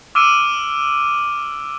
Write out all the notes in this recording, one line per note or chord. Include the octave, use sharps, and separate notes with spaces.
D6 E6 F6 D7 D#7